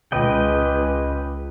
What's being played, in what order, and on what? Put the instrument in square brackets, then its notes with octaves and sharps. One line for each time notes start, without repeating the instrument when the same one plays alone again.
[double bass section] C#2 [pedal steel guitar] B4 D#5 G5